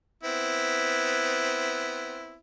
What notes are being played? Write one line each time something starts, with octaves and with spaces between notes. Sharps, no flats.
B3 C4 E4